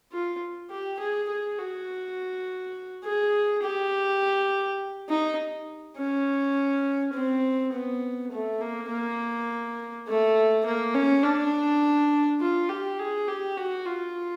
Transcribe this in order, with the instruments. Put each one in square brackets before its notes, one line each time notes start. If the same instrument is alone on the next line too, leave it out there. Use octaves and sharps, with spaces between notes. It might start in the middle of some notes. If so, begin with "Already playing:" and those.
[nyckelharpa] F4
G4
G#4
G#4
F#4
G#4
G4
D#4
C#4
C4
B3
A3
A#3
A#3
A3
A#3
C#4
D4
F4
G4
G#4
G4
F#4
F4